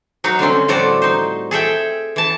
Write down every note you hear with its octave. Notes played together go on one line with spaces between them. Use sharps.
F#3 D#4 F#4
D3 G3 C4 C#4
A2 F3 G3 F#4 A4 D5
D#4 C5
G#4 A4 E5 G5
E3 A5